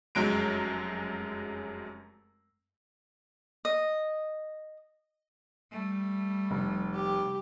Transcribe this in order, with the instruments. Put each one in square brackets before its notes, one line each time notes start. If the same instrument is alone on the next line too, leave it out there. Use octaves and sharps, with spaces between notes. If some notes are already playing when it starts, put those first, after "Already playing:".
[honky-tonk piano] F1 F#2 F#3 G#3 D7
[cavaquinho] D#5
[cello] G3 A3
[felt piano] F1
[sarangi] G4